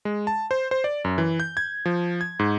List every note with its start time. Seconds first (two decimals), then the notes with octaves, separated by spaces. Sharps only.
0.05 G#3
0.27 A5
0.51 C5
0.71 C5
0.84 D5
1.04 F#2
1.18 E3
1.40 G6
1.57 G#6
1.85 F3
2.21 G#6
2.39 G#2